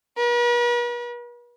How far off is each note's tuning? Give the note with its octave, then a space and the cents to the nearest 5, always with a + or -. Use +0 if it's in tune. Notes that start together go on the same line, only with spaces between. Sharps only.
B4 -45